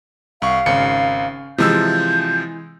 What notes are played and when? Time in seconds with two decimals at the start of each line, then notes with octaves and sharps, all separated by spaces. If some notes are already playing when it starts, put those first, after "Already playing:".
0.42 C2 F5 C#6
0.66 G#1 C#3 C#7
1.58 C3 E3 F3 G#3 E6 G6